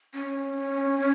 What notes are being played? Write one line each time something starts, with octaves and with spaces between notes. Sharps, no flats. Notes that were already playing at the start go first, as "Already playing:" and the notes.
C#4